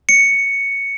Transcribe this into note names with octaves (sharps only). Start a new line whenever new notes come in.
C#7